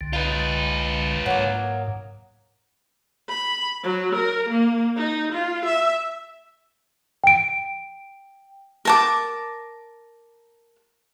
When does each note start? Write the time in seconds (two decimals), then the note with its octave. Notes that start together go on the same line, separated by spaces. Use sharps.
0.01 C2 D3
0.13 D#4 F4 B4
1.26 G#2 F#3 A#3
3.29 B5
3.83 F#3
4.15 A#4
4.50 A#3
4.97 D#4
5.32 F4
5.65 E5
7.24 G5 D7
8.85 A#4 A5 D6